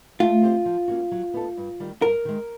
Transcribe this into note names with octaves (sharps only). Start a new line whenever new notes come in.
A3 F4
C4 E4 G4 C5
F3
A#3 C#4 F#4
F#3
B3 D#4 F#4 A4
G2
D#3 G3
G2 A#4
D#3 G#3